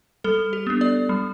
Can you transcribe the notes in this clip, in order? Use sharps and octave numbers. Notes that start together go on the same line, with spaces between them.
G3 A4
G4
B3 D4
D5
G3